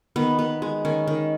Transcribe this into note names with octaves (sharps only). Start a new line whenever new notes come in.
D#3 B3
B3
G#3
D#3 C#4
D#3